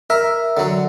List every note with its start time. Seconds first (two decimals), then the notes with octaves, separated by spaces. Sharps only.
0.10 A#4 E5
0.57 D3 F#3